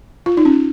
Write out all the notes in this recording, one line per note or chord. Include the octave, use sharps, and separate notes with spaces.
F4
D#4
C#4